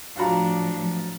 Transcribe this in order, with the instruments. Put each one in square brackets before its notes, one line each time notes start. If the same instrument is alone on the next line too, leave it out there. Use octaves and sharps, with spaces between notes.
[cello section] A2 F3 F#3 [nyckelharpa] D4 [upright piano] F4 F#4 A#5